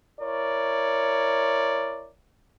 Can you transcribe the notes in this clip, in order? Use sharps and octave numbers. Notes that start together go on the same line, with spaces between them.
E4 A#4 C#5 D5